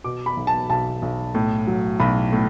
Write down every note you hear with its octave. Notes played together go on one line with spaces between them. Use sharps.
B2 D6
B5
B1
A5
B1 A5
B1
A2
F#3
B1 B5
A2